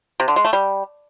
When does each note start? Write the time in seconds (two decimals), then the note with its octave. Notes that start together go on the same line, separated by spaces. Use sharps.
0.20 C3
0.28 D3
0.36 G#3
0.45 A3
0.53 G3